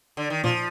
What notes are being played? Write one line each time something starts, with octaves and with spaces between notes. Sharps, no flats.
D3
D#3
A#2 F3